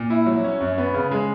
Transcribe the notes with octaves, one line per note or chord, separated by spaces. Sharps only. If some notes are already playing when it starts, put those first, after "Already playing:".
Already playing: A#2
E4
F#3
C#4
F#2
B3
C#3
G#3